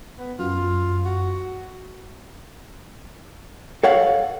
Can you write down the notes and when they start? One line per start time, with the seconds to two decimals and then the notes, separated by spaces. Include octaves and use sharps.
0.18 B3
0.39 F#2 F4
1.05 F#4
3.83 A4 C#5 F5 F#5